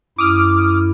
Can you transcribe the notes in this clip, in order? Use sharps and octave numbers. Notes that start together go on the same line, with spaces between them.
F#2 E4 D6 D#6 F6